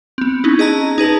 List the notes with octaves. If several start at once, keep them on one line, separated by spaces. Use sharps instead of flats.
B3 C4
C#4 D#4 E4
G#4 D#5 A5 A#5
D#4 G#4 B4 A5